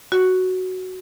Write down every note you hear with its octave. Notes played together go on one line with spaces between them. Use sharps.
F#4